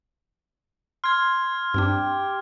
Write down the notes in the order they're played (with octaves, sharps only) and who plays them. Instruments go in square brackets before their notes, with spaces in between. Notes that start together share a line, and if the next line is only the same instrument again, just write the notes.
[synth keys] C6 [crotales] F6 G#6
[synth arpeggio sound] G2 C4 D4 [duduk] G4